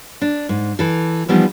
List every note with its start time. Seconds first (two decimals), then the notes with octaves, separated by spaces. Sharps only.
0.21 D4
0.49 G#2
0.79 E3 A4
1.28 E3 F3 G3 B3 D#4